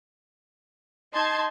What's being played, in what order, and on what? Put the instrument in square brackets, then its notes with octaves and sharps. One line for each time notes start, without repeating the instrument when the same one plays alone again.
[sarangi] D#4 [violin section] A5 C6 G#6